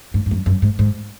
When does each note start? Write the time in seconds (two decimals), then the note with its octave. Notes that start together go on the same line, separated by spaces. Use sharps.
0.14 G#2
0.26 G#2
0.31 F#2
0.46 F#2
0.62 G#2
0.79 G#2